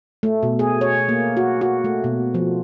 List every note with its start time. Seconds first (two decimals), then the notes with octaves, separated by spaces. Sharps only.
0.23 A3
0.43 B2
0.59 G#4
0.81 C#5
1.09 A#3
1.37 F#4
1.61 F#4
1.84 A3
2.04 B2
2.34 F3